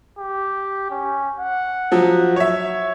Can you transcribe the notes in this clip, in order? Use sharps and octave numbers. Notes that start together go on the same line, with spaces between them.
G4
C#4
F#5
F3 F#3
C#5 E5